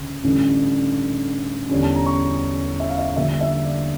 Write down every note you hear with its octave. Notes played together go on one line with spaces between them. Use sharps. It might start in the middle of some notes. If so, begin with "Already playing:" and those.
Already playing: D2 C#3
A1 G2 D3
E2 D3 G3 C#4
A5
A#5
C#6
E5
F5
E5
G1 G2 D3 F3 A#3 E5
E5
D5